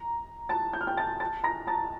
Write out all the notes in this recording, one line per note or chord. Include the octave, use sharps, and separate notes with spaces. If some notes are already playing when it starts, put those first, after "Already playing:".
Already playing: A#5
A5 A6
G6
F6
G5 G6
A5 A6
A5 A6
A#5 A#6
A5 A6